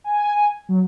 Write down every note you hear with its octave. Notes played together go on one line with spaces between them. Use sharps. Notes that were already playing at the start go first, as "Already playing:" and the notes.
G#5
F#3